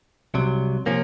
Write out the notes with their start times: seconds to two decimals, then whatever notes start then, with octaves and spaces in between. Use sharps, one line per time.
0.34 C2 C3 F#3
0.86 C3 F3 A#3 C#4